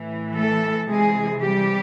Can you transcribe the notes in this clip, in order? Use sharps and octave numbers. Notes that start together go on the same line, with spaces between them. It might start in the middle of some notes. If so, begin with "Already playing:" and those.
Already playing: A2 E3
A3 A4
C3 E3 G#3 G#4
G3 G4